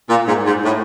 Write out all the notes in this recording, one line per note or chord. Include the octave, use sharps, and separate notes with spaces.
A#2
G#2
G#2
A2